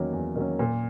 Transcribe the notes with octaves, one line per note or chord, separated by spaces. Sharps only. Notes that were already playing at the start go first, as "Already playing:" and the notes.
Already playing: E2 D#3 F#3 A#3 C#4
E2
D#3 F#3 A#3 C#4
A#2